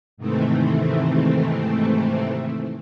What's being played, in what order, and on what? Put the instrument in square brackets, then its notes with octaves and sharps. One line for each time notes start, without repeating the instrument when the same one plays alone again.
[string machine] G#2 C3 D#3 E3 A3 C4